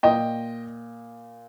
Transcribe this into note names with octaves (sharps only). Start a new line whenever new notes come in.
A#2 D#5 G5